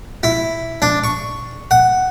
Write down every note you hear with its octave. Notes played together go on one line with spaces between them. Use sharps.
E4
D4
C#6
F#5